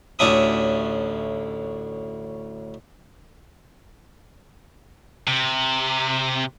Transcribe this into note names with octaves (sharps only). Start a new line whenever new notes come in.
A1 D2 C#4 D4 E5 D#6
C3